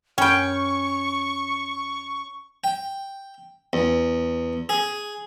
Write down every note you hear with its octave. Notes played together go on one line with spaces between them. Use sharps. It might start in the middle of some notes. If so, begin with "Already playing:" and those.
F#2 C#4 G5 B5 C#6
G5
E2
G#4